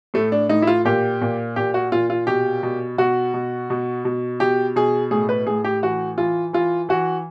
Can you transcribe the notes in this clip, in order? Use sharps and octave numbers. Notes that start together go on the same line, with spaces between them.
A2 A3
D4
A2 D#4
E4
F4
A#2 G4
A#2
A#2 G4
F#4
A#2 F4
F4
B2 G4
B2
B2 F#4
B2
B2
B2
B2 G4
B2 G#4
A2 G#4
B4
A2 G#4
G4
E3 F#4
E3 F4
E3 F4
E3 F#4